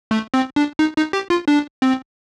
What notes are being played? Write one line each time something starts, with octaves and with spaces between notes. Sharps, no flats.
A3
C4
D4
D#4
D#4
G4
F4
D4
C4